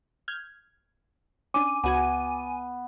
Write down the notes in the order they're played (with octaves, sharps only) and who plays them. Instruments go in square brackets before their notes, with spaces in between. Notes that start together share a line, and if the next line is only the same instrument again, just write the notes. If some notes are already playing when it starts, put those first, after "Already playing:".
[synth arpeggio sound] F6 G6 G#6
[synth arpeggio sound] C#4 D4 [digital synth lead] G#5 [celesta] D6
[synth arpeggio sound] C#2 F#4 G#6 [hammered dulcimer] B3 [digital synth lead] G#5